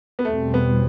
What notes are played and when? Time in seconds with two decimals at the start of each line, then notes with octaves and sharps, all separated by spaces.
0.19 B3
0.25 E2 B2 G3 A3 C4
0.54 B3